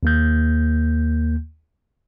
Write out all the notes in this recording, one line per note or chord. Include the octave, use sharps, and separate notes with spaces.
D#2 A#3 G6